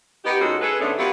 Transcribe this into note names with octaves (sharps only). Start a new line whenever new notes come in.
B3 D#4 G4
A#2 G#3 C#4 D#4 F#4 A4
G#4 A4 B4
G#2 D3 A3 B3 C#4 D4
F#3 B3 E4 F4 G4 A#4